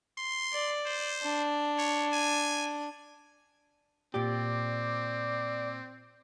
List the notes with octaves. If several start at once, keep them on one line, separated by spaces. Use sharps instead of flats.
C6
D5
C5
D4
C#5
G#5
A#2 C4 G4 D5